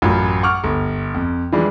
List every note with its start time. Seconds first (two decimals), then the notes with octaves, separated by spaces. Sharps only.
0.02 A1 F#2 F4 B5
0.43 F#5 C#6 D6 F6
0.64 G1
1.14 F2
1.52 E3 F3 G3 G#3 D4